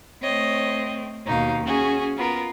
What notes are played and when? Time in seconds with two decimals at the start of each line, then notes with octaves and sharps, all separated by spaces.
0.22 A3 C4 C#5 D#5
1.26 D#2 B2 D#4 F5
1.66 C#4 F#4 G#4
2.17 B3 F4 A#4